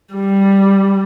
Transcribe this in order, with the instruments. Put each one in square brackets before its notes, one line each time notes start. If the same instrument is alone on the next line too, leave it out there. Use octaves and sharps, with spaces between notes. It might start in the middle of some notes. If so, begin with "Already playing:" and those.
[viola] G3